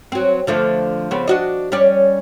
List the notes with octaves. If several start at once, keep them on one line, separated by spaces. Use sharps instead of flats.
F#3 C4
D3 F3 A3
C#3 B3 C4
D4 F#4 D#5
G3 C#4 D5